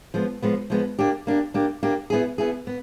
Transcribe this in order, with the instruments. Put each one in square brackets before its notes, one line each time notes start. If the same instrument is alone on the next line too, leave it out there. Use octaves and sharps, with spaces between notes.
[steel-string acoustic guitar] F3 G#3 B3
F3 G#3 B3
F3 G#3 B3
A#3 D4 G4
A#3 D4 G4
A#3 D4 G4
A#3 D4 G4
B3 E4 G#4
B3 E4 G#4
B3